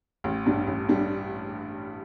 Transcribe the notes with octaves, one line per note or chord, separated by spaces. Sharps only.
A1
G2 G3 D4
A1
G3 D4